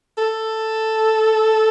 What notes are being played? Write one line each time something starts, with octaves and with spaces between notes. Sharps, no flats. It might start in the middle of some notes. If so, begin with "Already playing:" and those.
A4